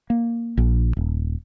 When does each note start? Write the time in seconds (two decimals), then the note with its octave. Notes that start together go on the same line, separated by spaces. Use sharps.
0.10 A#3
0.57 A#1
0.97 D#1